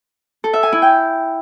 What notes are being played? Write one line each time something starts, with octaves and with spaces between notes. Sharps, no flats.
A4
E5
G#5
E4
G5